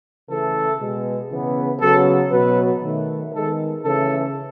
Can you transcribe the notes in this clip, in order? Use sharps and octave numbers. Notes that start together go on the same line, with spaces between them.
C#3 E3 A3 A4
B2 G#3 B3
C#3 E3 B3
C#3 F#3 B3 A4
B2 F#3 B3 B4
D#3 A3
D#3 G#3 B3 A4
C#3 E3 A3 A4